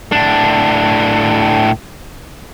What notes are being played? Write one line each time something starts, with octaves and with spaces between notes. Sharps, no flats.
A2 D4